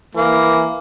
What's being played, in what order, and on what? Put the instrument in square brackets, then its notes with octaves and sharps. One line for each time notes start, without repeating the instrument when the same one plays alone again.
[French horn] E3 [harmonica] A#3